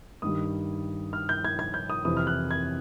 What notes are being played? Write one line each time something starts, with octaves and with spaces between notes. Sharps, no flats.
G2 D#3 G3 D#6
F6
G6
G#6
G#6
G6
D#6
F2 C3 E3 D#6
F6
F#6
G#6